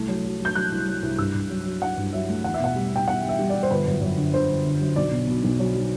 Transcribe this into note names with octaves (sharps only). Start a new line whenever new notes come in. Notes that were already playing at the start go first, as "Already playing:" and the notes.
Already playing: C2 A3
F#3
F#3
F#3
G6
F#3 F#6
C2
F#3
C2
G2 E6
G2
F#3
F#3
F#3 F#5
G2
F#3 E5
A3
E2 F#5
E5
B2 F#5
G3
B2 G5
B2 F#5
G3
E5
G3
D5
G3
C5
G1 B4
F#2
F#2
D3
D3 C5
G1
D3
F#3
B1 D5
B2
B2
B1
F#3
F#3